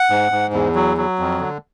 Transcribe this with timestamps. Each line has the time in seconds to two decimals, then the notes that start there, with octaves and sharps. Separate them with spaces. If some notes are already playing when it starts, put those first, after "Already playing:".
Already playing: F#5
0.10 G#2
0.31 G#2
0.53 E2
0.75 F#3
0.97 F#3
1.19 F2
1.40 D3